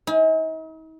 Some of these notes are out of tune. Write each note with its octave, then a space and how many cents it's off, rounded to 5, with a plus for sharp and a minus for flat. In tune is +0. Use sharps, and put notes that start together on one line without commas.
D#4 +45 G#5 +0